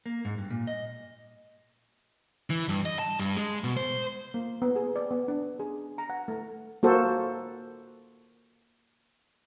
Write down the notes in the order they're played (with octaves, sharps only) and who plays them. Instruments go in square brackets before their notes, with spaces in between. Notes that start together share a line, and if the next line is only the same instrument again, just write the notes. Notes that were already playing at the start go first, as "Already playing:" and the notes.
[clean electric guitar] A#3
G#2
G2
A#2
D#5
[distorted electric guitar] E3
G2
D#5
A5
G2
G#3
B2
C5
[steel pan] A#3
B3
G#4
D5
B3
D4
G#4
A#5
F#5
A3
A#3 F#4 A4 C5